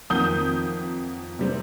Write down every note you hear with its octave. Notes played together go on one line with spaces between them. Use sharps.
F2 D#3 A#3 D#6 G6
C3 G3 C4